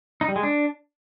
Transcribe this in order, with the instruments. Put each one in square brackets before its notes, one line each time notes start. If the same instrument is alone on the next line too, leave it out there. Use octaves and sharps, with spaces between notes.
[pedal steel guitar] D#4
G3
G#3
D4